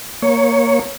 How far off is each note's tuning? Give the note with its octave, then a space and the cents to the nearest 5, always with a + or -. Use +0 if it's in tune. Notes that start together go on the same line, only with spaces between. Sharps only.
A#3 +0 C#5 +0